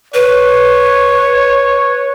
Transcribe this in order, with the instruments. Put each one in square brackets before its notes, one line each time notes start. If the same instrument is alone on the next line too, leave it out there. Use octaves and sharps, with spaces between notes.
[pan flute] B4 [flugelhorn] C#5